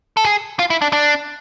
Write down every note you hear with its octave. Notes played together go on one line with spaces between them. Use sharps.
A4
G#4
F4
E4
D4
D4